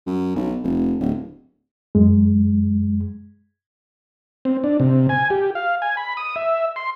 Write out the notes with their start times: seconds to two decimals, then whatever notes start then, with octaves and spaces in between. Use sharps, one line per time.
0.07 F#2
0.36 B1
0.64 F1
1.00 D1
1.95 F#2 G#3
4.45 C4
4.64 D4
4.80 C3
5.09 G#5
5.30 G4
5.55 F5
5.82 G#5
5.97 B5
6.17 D#6
6.36 E5
6.76 C6